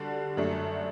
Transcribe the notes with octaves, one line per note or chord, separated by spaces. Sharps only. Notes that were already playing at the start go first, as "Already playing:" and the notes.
Already playing: D3 G3 D4 F#4
F#2 F#3 A3 D4